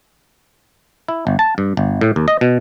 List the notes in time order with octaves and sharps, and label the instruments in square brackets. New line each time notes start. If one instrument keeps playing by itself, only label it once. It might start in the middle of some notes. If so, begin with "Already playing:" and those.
[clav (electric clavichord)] E4
G1
A5
G2
G1
A2
D#2
D#5
B2